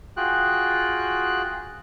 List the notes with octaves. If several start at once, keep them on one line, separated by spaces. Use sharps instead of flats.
F4 F#4 G#4 G5 F#6